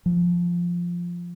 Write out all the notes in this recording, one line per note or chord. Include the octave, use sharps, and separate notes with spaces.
F3